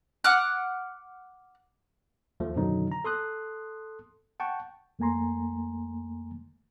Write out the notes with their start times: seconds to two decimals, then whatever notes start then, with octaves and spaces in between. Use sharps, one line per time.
0.24 F#5 D6 F6 F#6
2.40 D#2 F3 A3
2.55 F#2 B2 D3 D#3 F#3 D#4
2.92 A#5
3.05 A4 C6 D#6 F#6
4.40 F#5 G5 A5 C#6
4.99 F2 A3 A#3 G#5 A#5 C6